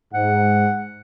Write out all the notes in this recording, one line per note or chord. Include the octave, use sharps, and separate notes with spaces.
G#2 F#5